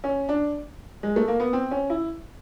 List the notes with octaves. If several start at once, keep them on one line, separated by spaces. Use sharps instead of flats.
C#4
D4
G#3
A3
A#3
B3
C4
C#4
E4